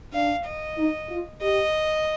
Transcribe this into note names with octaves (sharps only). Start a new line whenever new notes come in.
D4 F5
D#5
D#4
F4
G4 D#5